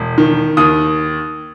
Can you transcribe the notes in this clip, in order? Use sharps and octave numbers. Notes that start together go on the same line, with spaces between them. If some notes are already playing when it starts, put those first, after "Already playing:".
Already playing: E1
D#3
D#2 D#6